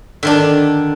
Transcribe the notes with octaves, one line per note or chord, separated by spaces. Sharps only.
D3 D#3 D4